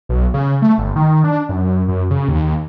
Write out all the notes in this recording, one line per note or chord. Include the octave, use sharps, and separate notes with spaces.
B1
C#3
A3
G1
D#3
D4
F#2
F#2
F#2
C#3
D#2